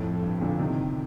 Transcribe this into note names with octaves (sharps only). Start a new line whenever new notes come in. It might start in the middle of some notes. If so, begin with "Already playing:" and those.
Already playing: F2 A2
G2
A#2 D3
C3 D#3